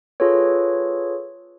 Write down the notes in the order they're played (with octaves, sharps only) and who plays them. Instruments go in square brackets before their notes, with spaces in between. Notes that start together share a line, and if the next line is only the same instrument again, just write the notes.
[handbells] F4 G#4 A4 B4 C#5